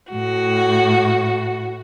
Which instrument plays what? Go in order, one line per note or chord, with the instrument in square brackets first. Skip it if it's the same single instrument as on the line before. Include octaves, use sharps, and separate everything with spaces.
[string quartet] A2 F#4